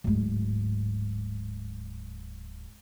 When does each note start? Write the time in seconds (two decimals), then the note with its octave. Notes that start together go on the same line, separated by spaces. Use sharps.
0.04 D1 G#2